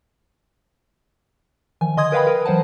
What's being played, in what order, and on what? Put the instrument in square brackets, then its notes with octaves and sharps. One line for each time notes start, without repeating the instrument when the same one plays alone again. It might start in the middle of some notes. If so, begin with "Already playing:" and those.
[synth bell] D#3 F3 G#5
D3 D#5 C6 D#6 G#6
A#4 B4 F5 G5 B5
A#4
E3 F#3 C5 F#5 A5